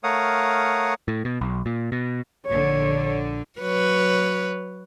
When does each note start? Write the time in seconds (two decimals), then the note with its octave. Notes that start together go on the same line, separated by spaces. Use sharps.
0.04 A3 A#4 C#5 F5 F#5 D#6
1.08 A2
1.25 B2
1.41 B1
1.66 A#2
1.92 B2
2.47 A#1 D3 C#5
3.59 F#3 B4 C#5